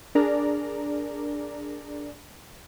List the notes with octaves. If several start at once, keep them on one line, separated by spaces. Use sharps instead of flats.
D4 G#4 A#4 D5 A#5